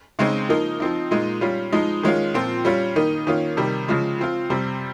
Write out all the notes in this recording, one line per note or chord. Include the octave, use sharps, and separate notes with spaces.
C#3 G#3 C4 D#4
F3 A#3 D#4
F3 C4 D#4
A#2 G#3 D#4
G3 C#4 F4
F3 G#3 D#4
D#3 G#3 C#4 F4
A#2 F3 C4
G3 C#4 F4
D#3 A#3 D#4
D#3 A#3 C#4 F4
C3 D#3 G3
C#3 F3 G#3
F3 C4 F4
C3 G3 C4